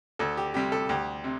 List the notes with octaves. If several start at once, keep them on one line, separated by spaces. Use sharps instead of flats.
D2 A4
G4
C3 G3 G4
A4
D2 G4
C3